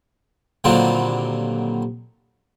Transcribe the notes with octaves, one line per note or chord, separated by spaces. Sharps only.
A#2 D3 D#3 F#3 G3 C4